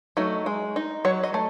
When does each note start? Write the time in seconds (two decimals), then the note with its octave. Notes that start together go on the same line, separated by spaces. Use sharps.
0.17 F#3 A3 D#4
0.46 G#3
0.76 D#4
1.05 F#3 C#5
1.23 D#5
1.34 A3